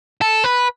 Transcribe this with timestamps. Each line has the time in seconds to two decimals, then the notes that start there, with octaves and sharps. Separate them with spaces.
0.21 A4
0.44 B4